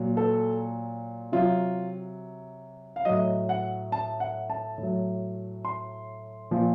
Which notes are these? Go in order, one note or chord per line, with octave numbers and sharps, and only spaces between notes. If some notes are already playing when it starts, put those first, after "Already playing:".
Already playing: A#2 F#3
A4
C3 F#3 F4
F5
A2 F#3 D#5
F#5
A5
F#5
A5
A2 F#3
C6
A#2 F3